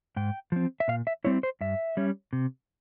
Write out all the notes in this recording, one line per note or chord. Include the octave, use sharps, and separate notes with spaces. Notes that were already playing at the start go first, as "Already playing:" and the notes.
G#2 G5
F3 C4
E5
A#2 F5
E5
G3 C4 E4 C#5
C5
G2 E5
G3 C#4
C3